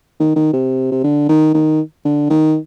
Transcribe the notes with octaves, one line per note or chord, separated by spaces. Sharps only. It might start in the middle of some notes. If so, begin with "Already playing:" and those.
D#3
D#3
C3
C3
D3
D#3
D#3
D3
D#3